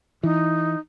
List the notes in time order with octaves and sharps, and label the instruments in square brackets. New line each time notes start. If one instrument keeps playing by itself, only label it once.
[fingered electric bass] E3 [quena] D#4